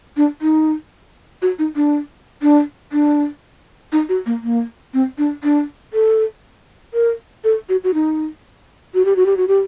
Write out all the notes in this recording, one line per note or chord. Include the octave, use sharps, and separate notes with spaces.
D4
D#4
F#4
D#4
D4
D4
D4
D#4
F#4
A#3
A#3
C4
D4
D4
A4
A#4
A4
F#4
F#4
D#4
F#4
G4
F#4
G4
F#4
G4